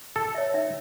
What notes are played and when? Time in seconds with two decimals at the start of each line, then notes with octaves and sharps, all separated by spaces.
0.16 A4
0.35 C#5 E5
0.54 D#4 E5